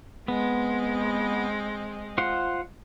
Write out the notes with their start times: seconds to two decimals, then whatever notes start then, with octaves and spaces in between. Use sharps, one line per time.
0.28 G#3 B3 C4
2.18 F4 C5 F#5